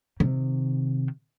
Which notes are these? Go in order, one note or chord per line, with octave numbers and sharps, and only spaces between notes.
C3 D#3